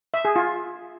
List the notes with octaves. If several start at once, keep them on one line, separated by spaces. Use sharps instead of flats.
E5
G#4
F4